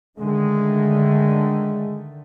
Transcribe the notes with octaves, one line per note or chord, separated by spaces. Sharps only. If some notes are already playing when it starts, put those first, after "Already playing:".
D3 D#3 G#3 A3